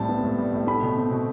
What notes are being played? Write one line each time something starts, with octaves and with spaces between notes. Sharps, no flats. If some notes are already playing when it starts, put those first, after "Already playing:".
Already playing: A2 G3 C4 A5
B3
A2
G3
A2
A3 B5
B2
C4
B2